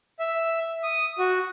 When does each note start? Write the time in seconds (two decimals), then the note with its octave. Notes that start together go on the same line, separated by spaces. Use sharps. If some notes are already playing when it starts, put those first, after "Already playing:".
0.19 E5
0.83 D#6
1.19 F#4